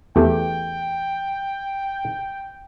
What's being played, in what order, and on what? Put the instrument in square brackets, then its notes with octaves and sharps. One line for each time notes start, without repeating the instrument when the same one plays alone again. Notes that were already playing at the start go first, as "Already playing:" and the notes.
[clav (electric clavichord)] E2 A3 G4 [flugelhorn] G5